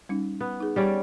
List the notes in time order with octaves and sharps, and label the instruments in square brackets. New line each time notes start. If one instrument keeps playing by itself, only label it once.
[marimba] G3 C#4 D#4
[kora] B3
[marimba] D#4 G#4
[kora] G3 C#4 D5